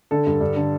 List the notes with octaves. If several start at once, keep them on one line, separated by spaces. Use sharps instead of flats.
D3 A4
G2
G2
D3